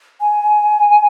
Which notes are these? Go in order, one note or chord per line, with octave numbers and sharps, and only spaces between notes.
G#5